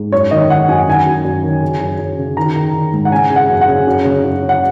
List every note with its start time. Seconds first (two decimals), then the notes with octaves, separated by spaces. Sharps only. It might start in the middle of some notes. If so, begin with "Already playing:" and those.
Already playing: G#2
0.12 F#2 C#5
0.31 D#3 D#5
0.50 D#3 F#5
0.68 F#2 G#5
0.78 F#5
0.88 D#3 G#5
1.07 F#2
1.25 F#2
1.43 D#3
1.63 C#3
1.81 F#2
1.99 F#2
2.19 C#3
2.37 D#3 A#5
2.56 D#3
2.74 D#3
2.93 G#2
3.05 F#5
3.11 C#3 G#5
3.30 C#3
3.36 F#5
3.49 F#2
3.61 F#5
3.68 C#3
3.87 F#2
4.05 C#3
4.24 F#2
4.42 C#3
4.49 F#5